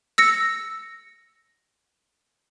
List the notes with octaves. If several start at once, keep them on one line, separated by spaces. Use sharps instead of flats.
E6 A#6 C#7